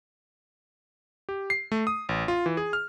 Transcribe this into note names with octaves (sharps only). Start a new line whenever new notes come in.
G4
C7
A3
D#6
A1
F4
E3
G#4
F6